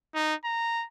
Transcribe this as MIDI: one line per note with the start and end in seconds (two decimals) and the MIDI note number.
0.15 0.35 63
0.45 0.85 82